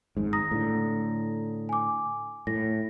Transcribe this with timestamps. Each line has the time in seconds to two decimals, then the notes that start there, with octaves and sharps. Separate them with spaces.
0.17 G#1 G#2
0.33 A#5 D#6 A#6
0.51 A2 D3
1.69 G#5 D6
2.47 A2 A#6